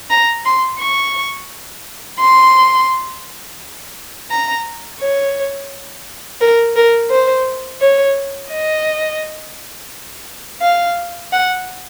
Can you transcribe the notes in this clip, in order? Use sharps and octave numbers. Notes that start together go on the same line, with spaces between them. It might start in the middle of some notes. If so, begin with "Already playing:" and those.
A#5
C6
C#6
C6
A#5
C#5
A#4
A#4
C5
C#5
D#5
F5
F#5